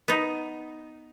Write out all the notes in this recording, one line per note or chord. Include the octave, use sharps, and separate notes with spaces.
B3 D#4